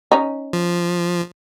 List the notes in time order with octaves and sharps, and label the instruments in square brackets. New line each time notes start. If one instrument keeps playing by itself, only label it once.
[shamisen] C#4 D#4
[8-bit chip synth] F3